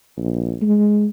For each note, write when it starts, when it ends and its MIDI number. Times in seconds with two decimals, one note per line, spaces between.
0.18 0.55 34
0.62 1.07 56